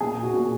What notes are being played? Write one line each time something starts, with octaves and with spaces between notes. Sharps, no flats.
A#2 G#4
F#4
A#2